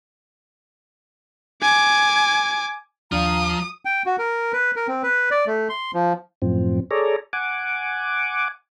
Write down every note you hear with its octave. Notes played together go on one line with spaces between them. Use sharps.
G#5 D6
D#2 F3 D4 F5 A#5 D#6 F6
G5
F#4
A#4
B4
A#4
C4
B4
D5
A3
C6
F3
F#2 A2 F3 C4
G#4 A4 C#5 D5 A#5
F#5 G#5 D6